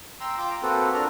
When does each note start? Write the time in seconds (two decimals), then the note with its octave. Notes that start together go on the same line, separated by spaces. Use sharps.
0.20 G5 A#5 C6 E6
0.38 F4 G5 D6
0.50 A#5
0.62 A#3 C4 F#4 A4 B4
0.94 D4 F4 A4 A#4 A#5